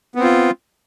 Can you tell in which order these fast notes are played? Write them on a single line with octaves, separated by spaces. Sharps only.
B3 C4 F4